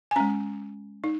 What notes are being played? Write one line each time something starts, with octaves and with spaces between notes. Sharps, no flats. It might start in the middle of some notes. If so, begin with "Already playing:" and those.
G#5
G#3 C#4 A#5
D#4